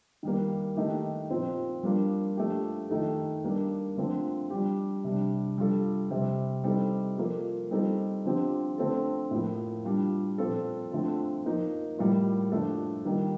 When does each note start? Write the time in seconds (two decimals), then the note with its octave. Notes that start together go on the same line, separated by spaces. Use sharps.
0.23 D#3 G3 A#3
0.76 D#3 A3 D#4 G4
1.30 A#2 F3 C4
1.83 G3 A#3 D4 F4
2.37 F3 A3 D4 G4
2.90 D#3 A3 D#4 A4
3.44 G3 A#3 D4
3.97 D3 F3 A3 C4 F4
4.50 G3 D4 G4
5.04 C3 G3 D4
5.58 G3 D4 F4 A4
6.11 C3 G3 C4 G4
6.64 G3 C4 D#4 A4
7.18 F3 A#3 F4 A4
7.71 G3 C4 D#4 A4
8.25 D3 F3 C4 G4
8.78 D3 A3 C4 F4 A4
9.31 A2 F3 A#3
9.85 G3 D4 F4
10.38 A#2 F3 C4 F4 A4
10.92 D3 F3 A3 C4
11.45 F3 A#3 D#4
11.99 A2 G3 A#3 F4
12.52 D3 F3 A3 D4 A4
13.05 D#3 G3 A#3